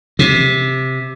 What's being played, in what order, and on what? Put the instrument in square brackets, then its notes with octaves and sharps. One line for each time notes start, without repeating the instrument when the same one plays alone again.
[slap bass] C3